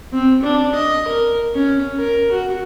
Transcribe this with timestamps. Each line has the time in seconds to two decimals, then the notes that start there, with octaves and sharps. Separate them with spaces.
0.12 C4
0.42 D4
0.75 D#5
1.08 A#4
1.55 C#4
1.98 A#4
2.31 F#4